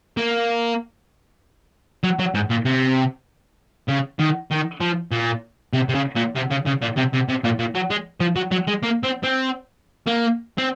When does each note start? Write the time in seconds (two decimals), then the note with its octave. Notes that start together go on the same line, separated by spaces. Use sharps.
0.17 A#3
2.04 F#3
2.19 F#3
2.34 G#2
2.50 A#2
2.65 C3
3.88 C#3
4.19 D#3
4.51 D#3
4.80 F3
5.11 A#2
5.73 C3
5.89 C3
5.94 C#3
6.15 A#2
6.35 C3
6.50 C#3
6.66 C#3
6.81 A#2
6.97 C3
7.13 C3
7.28 C3
7.44 A#2
7.59 A#2
7.75 F#3
7.90 G#3
8.20 F3
8.36 F#3
8.51 F#3
8.67 G#3
8.83 A#3
9.03 C4
9.23 C4
10.07 A#3
10.58 C4